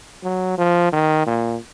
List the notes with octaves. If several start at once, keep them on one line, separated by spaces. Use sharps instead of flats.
F#3
F3
D#3
A#2